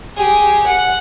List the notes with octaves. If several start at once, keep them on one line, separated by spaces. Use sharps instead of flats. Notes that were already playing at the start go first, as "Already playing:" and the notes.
G4 G#4
F#5